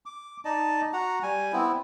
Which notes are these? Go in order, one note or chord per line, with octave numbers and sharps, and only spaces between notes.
D6
D#4 D5 D#5 A5
F#4 F#5 A#5
G3 G#5
B3 C4 E4